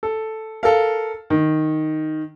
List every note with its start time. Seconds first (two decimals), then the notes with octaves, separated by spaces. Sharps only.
0.03 A4
0.63 A4 A#4 F5
1.30 D#3